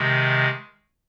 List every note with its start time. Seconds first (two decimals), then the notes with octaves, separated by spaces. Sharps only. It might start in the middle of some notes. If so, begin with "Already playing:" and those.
Already playing: C3 D#3 G#3